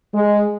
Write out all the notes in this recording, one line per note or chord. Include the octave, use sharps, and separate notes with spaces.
G#3